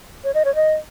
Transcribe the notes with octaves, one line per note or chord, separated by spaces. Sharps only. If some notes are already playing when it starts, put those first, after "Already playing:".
C#5
D#5
C#5
D#5